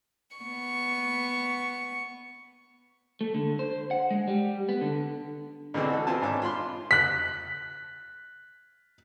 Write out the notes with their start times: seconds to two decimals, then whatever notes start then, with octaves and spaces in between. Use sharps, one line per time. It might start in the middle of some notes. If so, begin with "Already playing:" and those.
0.38 B3 C#6
3.21 A3
3.35 D3
3.59 C5
3.91 F#5
4.11 G#3
4.28 G3
4.69 B3
4.81 D3
5.74 B2 D3 E3 G#3 C4 D4
5.90 F#4 A4
6.07 B3 C4 F4 G#5 A5
6.22 G#1 G#2 D4 C#5 D6
6.42 F4 B5 C6
6.91 F#6 B6